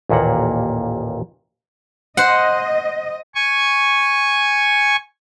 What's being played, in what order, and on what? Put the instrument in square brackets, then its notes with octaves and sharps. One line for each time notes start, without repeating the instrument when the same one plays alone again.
[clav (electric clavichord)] A1 D#2 A#2 A#3 F#5
[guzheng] C5 F#5 [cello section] D#5
[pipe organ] G#5 C#6